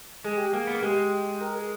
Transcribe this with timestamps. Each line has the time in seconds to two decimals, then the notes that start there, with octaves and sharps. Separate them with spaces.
0.24 G#3 G#4
0.37 G4
0.51 A#3 G#4
0.67 B3
0.75 A#3
0.83 G#3 G4
1.41 A#4
1.55 G#4